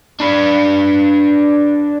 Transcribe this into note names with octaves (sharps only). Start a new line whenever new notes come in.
D4 B4